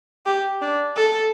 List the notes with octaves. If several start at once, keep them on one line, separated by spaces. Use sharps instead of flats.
G4
D4
A4